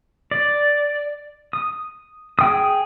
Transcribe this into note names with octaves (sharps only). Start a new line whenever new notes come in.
D5
D#6
G#4 G5 D#6